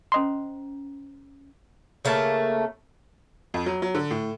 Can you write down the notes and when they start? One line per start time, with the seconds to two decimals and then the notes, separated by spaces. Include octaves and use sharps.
0.12 C#4 C5 D#5 A#5 C6
2.05 C#3 A3 A#3 A5
3.54 F2
3.66 F#3
3.82 F#3
3.95 D3
4.11 A2